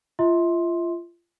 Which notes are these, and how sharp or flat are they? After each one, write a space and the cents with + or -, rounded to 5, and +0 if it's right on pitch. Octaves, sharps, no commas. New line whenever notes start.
F4 -25 E5 -35 C6 +5